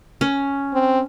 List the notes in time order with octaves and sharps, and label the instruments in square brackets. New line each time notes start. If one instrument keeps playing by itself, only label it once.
[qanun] C#4
[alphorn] C4